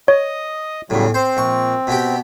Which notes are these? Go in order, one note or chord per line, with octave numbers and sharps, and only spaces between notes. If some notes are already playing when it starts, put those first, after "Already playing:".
C#5 D#5 D#6
E2 A2 C#3 F#3 G3
C4 C5
A#1 C#6
B2 B3 G4